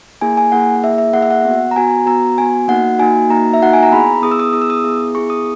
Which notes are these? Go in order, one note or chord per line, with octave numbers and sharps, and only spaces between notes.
A#3 E4 G#4 G#5
G#5
A#3 E4 G#4 F#5
A#3 E4 G#4 E5
E5
A#3 E4 G#4 F#5
E5
F#5
B3 F#4
A#5
B3 F#4 G#5
B3 F#4 A#5
B3 F#4 G#5
A#3 D#4 F#4 F#5
A#3 D#4 F#4 G#5
A#3 D#4 F#4 A#5
E5
A#3 D#4 F#4 F#5
G#5
A#5
B3 E4 G#4 B5
B3 E4 G#4 D#6
E6
D#6
B3 E4 G#4 D#6
E6
D#6
B3 E4 G#4
B3 E4 G#4 C#6
D#6